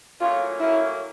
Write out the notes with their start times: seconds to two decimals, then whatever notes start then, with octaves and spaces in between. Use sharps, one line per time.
0.20 A2 F#3 A#3 C#4 F4
0.59 A2 F#3 A#3 C#4 E4